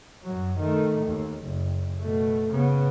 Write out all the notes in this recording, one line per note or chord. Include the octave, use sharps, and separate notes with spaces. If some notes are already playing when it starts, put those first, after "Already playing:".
F#2 F#3
D#3 A3
D#2
F#1
B2 A3
C#3 B3